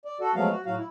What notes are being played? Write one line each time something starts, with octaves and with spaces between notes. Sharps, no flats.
D5
F#4 A4
F3 F#3 G#3 A3 B3 F5
F#4
A2 F#3 F#4 F5
E4